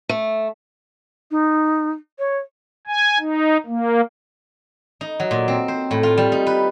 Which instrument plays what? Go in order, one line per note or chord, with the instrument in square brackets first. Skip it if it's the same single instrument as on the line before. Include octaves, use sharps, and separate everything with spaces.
[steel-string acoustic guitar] A3
[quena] D#4
C#5
[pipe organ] G#5
D#4
A#3
[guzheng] D#4
F#3
A#2
C4
C5
A2
F4
G3
D#4
B4